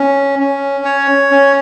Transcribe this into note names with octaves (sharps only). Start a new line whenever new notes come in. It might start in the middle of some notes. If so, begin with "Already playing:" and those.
Already playing: C#4
C#4
C#5
C#4